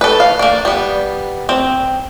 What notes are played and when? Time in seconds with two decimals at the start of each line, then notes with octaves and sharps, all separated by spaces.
0.01 A4 B4
0.20 F5
0.39 A#3 D4
0.65 G3 B3
1.49 C4